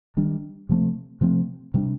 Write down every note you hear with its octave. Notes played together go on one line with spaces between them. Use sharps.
D#3 G3 D4
C3 F3 A3 C4
C3 F3 A3 C4
C3 G3 D4